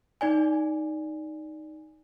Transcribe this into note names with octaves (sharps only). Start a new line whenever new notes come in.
D#4 D5 G#5